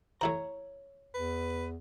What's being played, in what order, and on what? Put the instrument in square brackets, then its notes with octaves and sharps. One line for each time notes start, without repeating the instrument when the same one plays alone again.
[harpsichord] A3 E4 C5 [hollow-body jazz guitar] C#5 A#5
[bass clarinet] E2 [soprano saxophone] B4